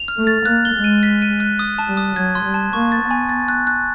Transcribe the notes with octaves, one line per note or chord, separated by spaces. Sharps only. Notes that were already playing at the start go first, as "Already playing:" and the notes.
Already playing: F7
F6
A3
A6
A#3 F#6
G7
G#3
D#7
B6
D#7
F#6
D#6
A5
G3
D#6
F#3 G#6
C6
G3
A5
A#3 C#6
A6
B3
G#5
A6
F#6
F#6